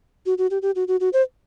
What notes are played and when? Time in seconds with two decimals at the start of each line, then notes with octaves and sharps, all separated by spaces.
0.26 F#4
0.38 F#4
0.51 G4
0.62 G4
0.76 F#4
0.88 F#4
1.00 F#4
1.13 C5